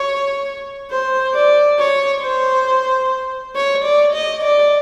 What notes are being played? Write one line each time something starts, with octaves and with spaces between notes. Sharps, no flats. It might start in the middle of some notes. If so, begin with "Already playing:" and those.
Already playing: C#5
C5
D5
C#5
C5
C#5
D5
D#5
D5